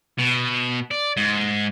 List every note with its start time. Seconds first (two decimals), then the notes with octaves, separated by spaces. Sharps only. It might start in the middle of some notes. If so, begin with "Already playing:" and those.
0.19 B2
0.91 D5
1.17 G#2